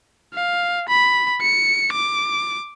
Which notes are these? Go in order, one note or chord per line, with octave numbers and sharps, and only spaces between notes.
F5
B5
C#7
D6